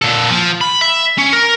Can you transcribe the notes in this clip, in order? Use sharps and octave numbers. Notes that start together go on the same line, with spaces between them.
A#2 A4
F3
B5
E5
C#4
A#4